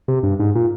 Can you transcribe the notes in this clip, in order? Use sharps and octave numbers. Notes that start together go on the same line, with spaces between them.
C3
G2
G#2
A#2